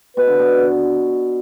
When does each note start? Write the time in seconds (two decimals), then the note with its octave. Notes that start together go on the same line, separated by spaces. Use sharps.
0.17 B2 B4
0.27 D3
0.39 B2